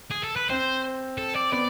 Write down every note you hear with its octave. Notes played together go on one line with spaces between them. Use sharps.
G#4
A4
B4
C4 C5
A4
D5
B3 D5